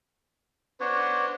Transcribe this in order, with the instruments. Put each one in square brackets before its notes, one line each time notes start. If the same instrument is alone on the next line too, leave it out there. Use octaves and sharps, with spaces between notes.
[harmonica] B3 C5 [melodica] D4 F#4 C#5